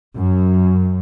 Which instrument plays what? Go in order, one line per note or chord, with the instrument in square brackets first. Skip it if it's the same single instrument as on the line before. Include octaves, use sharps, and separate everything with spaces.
[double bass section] F#2